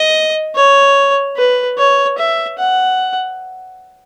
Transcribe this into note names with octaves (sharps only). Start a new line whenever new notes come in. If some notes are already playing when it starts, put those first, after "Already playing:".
Already playing: D#5
C#5
B4
C#5
E5
F#5